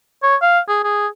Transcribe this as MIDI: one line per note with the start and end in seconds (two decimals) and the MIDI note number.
0.23 0.36 73
0.42 0.59 77
0.68 0.80 68
0.84 1.07 68